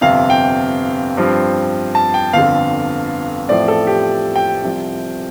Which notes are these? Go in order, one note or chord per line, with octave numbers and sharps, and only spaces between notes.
G1 F2 C3 F5
G5
G2 F3 C4
A5
G5
G1 F2 D3 F5
A1 A2 F3 A3 C4 D5
A4
G4
G5
C2 C3 F3